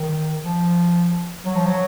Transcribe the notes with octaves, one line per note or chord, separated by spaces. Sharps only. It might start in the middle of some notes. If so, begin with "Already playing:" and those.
Already playing: D#3
F3
F#3
F3
F#3